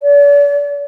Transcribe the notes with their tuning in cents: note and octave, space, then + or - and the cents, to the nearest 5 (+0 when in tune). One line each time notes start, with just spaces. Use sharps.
D5 -45